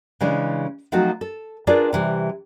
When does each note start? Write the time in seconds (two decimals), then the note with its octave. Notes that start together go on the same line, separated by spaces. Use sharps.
0.21 C#3 E3 G#3 D4
0.92 F3 F#3 A3 C4 D#4 F#4
1.21 A4
1.67 D4 F4 G#4 A#4 B4 D5
1.93 C3 E3 G3